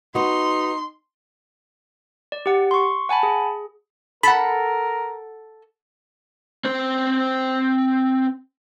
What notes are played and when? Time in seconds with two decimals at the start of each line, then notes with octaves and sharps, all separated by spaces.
0.15 B3 D#4 F#4 C6
2.32 D5
2.46 G4 F#5
2.71 C6 C#6
3.09 F#5 G#5 A5 B5
3.23 G#4
4.23 A4 A#4 F#5 B5
6.65 C4 C5